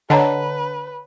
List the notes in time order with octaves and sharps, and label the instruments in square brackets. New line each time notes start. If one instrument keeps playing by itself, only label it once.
[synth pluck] D3 [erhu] B4 [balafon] C#5 D#5 [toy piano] F#5 A5 A#5